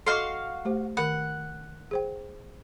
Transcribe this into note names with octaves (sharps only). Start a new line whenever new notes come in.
F#4 A4 D#5 F5 C6 D6
A3 G4 C5
D#3 A#4 F#5 B5
G#4 C5 G5